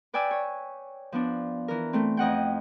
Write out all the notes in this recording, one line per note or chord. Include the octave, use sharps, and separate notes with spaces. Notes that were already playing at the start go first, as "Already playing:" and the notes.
B4 D5 G5 G#5 D6 E6
C#5
F3 B3 D4
E3 A#4
A3 C4
F2 D#5 F#5 G5